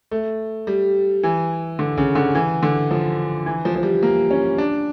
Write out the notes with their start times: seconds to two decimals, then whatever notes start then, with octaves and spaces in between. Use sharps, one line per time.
0.11 A3
0.67 G3
1.23 E3
1.79 D3
1.97 C#3
2.15 D3
2.35 E3
2.63 D3
2.91 F3
3.46 E3
3.65 F3
3.75 F3
3.83 G3
4.03 A#3
4.31 C#4
4.58 D4